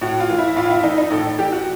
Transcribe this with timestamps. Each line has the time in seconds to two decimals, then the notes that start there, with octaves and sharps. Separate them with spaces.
0.01 A2 F#4
0.20 F4
0.30 E3
0.38 E4
0.56 A2 F4
0.70 E4
0.83 E3 D#4
0.98 D#4
1.11 A2 A4
1.39 E3 G4
1.52 F#4